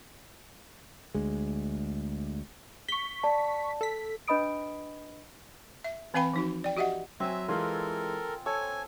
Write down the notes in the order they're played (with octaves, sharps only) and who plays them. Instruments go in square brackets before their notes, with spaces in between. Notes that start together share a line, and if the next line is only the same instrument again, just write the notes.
[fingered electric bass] D2 G#3
[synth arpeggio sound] C#6 B6 [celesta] G7
[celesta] D5 A5
[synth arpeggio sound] A4 B6
[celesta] D4 B4 D#5 B5 D#6 D7
[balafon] E5
E3 C4 B4 F5 G5 B5
F3 D#4 F#4
D5 G5
F#4 G4 D#5 E5 F#5
[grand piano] F#3 [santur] C4 G#5 [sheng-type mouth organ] E5
[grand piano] E3 G#3 [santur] F4 [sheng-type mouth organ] A4 A#4
[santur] A4 [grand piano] C#5 [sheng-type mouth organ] G#5